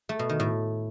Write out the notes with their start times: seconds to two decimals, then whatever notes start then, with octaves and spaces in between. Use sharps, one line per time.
0.09 A3
0.19 B2
0.29 D#3
0.40 A2